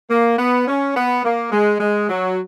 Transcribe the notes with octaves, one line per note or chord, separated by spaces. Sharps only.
A#3
B3
C#4
B3
A#3
G#3
G#3
F#3